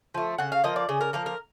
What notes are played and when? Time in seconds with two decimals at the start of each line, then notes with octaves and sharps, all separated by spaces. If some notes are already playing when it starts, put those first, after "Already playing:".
0.14 F3 A3
0.38 C#3 F#5
0.52 F5
0.64 F3 A#3 D#5
0.76 D5
0.89 C#3 G#4
1.01 A#4
1.13 F3 A#3 A#4
1.26 A#4